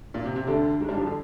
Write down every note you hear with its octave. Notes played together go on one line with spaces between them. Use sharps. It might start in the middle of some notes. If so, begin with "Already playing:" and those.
A#2
C3
C3
D2 D3
G#2 G#3
G2 G3
F2 F3
D3